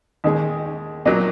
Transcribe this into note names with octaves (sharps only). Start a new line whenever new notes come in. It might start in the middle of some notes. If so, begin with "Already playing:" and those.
D#2 D#3 G#3
A#2 F#3 A#3 D#5